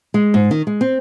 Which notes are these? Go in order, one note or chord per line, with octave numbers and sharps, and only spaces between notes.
G#3
G#2
D#3
G#3
C4